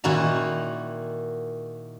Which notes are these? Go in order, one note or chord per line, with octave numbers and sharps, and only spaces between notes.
A#2 D#3 E4 F#4 A#5